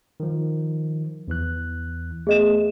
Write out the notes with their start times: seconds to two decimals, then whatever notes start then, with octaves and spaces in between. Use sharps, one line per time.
0.20 D#3 F3
1.28 E2 E3 F#6
2.27 A3 B3 G#4 D#5 E7